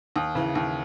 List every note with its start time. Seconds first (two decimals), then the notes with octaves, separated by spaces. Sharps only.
0.16 D#2 D#6
0.35 C#3 E3
0.55 D#2